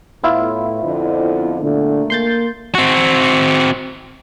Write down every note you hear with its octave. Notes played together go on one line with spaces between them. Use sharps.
A2 B3 E4 F4
F2 D3
A#2 D3 A3
A#3 C6 G6 A6
C4 F#4